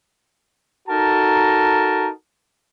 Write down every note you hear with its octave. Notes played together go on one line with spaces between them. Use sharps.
D#4 F#4 A4 A#4 A5 A#5